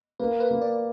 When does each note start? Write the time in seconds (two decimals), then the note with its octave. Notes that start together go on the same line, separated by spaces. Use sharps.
0.19 A#3 B4
0.40 B4
0.51 A#3
0.61 D5